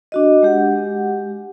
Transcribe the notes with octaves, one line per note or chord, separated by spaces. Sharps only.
D4 F#4 D#5
G#3 G4 F#5